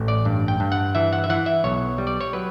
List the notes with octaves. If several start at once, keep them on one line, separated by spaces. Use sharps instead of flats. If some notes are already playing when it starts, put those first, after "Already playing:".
Already playing: A1
D5
G2
G5
G2
F#5
E3 E5
F#5
E5
E3 F#5
E5
B1 C#5
G3
D5
C#5
F#3 B4